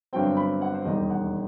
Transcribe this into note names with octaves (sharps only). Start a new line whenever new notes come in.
G1 G2 F#3 C4 G5
B5
F#5
C5
E1 D#2 D#3 G3 D#4 D#5
F#5